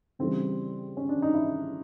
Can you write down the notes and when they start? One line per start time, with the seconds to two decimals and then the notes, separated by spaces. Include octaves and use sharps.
0.19 C#3 E3 G3 C4
0.97 C#4
1.09 D4
1.22 D#4
1.34 E4